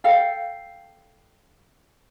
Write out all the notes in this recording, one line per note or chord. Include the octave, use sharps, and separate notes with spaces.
A4 F5 G5